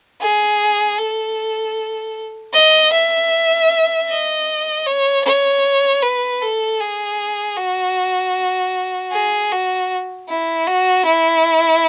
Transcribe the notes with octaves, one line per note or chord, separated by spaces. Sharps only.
G#4
A4
D#5
E5
D#5
C#5
C#5
B4
A4
G#4
F#4
G#4
F#4
E4
F#4
E4